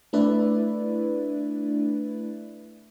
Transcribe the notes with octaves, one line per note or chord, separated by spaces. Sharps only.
A3 D4 E4 B4 D5 E5